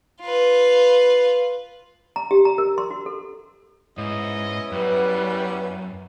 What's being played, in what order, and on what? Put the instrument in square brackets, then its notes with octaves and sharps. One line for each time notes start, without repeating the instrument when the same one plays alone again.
[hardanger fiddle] F4 B4
[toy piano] A#5
G4
A#5
A#4
C6
F#4
A4
[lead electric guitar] G#2 [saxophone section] B3 C#4 E4 [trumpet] D#5
[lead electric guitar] F#2 [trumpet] G3 [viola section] B4